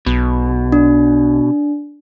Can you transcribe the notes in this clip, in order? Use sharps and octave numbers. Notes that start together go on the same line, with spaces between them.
B1 B2
D4